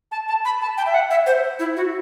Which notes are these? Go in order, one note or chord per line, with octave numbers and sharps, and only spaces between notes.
A5
A5
B5
A5
G5
E5
F#5
E5
C5
E4
F#4